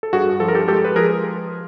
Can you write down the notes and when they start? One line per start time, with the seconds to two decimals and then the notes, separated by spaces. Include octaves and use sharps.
0.03 A4
0.13 G2 F#4 G#4
0.40 F3 A4
0.48 A#4
0.55 G4 A4
0.67 G#3 G4 A4
0.85 B4
0.95 F3 G#4 A#4